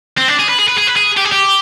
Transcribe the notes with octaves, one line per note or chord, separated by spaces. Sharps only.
C4
D4
G#4
B4
G#4
B4
G#4
B4
G#4
G4
G#4
G4